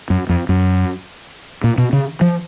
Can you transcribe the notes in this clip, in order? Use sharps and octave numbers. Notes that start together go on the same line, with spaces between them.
F#2
F2
F#2
A#2
B2
C#3
F3